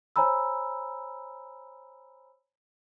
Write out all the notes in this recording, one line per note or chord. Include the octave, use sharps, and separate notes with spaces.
C5 C#5 G#5 A#5 B5 E6